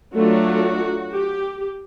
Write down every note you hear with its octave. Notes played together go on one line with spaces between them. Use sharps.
F#3 A3 D4 F4 F#4
G4